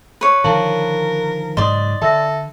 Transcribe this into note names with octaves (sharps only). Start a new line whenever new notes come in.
B4 C#5
D3 D#3 F3 A#4 F5 A5 F#7
G#2 C#3 F#3 D5 D#5 C6 D#6
D3 A4 E5 E6 A#6